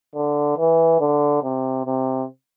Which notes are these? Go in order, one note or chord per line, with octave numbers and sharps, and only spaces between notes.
D3
E3
D3
C3
C3